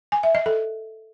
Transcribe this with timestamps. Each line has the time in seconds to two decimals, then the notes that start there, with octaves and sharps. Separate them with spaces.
0.12 G#5
0.23 E5
0.35 D#5
0.46 A4